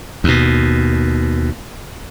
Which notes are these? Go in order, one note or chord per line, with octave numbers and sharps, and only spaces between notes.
D#2 B2